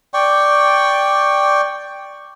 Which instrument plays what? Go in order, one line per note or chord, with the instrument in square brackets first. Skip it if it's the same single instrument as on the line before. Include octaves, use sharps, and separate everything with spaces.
[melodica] D5 G5 C#6